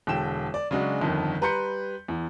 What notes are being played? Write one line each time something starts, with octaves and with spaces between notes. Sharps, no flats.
E1 D3 G5 E7
D5
C#3 F#3 G#3 D4 F#4
G1 F2 D3 D#3
G3 B4 A#5 C6 G6 C#7
E2